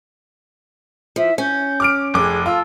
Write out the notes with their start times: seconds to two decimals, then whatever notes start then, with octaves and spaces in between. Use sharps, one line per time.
1.16 F3 E5
1.38 C#4 G6
1.80 D6 F6 D7
2.14 F1 G#4 D6
2.46 F4 A4 E6